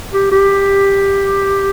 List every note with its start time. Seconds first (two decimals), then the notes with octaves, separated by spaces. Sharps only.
0.12 G4
0.32 G4